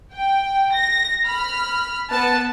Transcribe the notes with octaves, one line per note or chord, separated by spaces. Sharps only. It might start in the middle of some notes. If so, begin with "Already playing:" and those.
G5
A#6
B5 F6
B3 A5